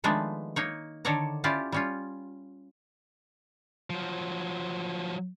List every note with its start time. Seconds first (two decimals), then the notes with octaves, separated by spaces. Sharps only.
0.04 D#3 F3 G#3 A3 B3 D4
0.56 A#3 D#4 C#5
1.05 D3 D#3 A4 C#5 D5 A#5
1.44 C#4 E4 F4 G4 D5
1.72 G3 C#4 F4
3.90 F3 F#3